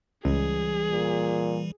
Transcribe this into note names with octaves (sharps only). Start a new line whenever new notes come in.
C#2 E3 G3 G#4
A#2